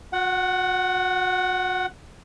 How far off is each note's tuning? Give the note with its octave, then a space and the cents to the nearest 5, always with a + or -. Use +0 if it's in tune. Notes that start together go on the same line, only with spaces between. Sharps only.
F#4 -35 F#5 +10